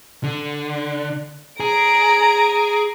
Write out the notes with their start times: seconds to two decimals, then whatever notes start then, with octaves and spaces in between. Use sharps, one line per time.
0.24 D3
1.60 G#4 A#5 D7